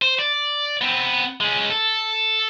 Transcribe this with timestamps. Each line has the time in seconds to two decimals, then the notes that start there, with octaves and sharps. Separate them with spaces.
0.02 C5
0.19 D5
0.81 B3 C4
1.40 G#3 C#4
1.70 A4